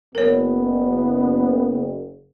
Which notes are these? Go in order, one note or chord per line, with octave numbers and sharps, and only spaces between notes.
F#1 B3 A#4 C#5